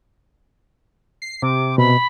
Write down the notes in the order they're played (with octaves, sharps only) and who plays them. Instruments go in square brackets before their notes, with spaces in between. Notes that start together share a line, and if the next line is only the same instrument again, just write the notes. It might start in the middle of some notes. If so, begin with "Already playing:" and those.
[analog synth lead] C7
[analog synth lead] C3 [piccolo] D6
[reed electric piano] B2 [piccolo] B5